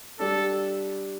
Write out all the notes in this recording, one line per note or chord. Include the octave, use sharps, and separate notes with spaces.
G3 D4 G4 A4